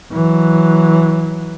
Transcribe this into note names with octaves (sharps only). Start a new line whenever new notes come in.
E3 F#3